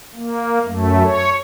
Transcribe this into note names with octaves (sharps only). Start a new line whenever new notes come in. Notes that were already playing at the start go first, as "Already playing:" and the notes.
A#3
F#2 A3
C#5